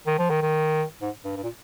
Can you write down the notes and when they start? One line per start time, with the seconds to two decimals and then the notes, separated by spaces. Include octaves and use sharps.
0.07 D#3
0.19 F3
0.30 D#3
0.42 D#3
1.01 G#2
1.25 G2
1.37 G2
1.44 A#2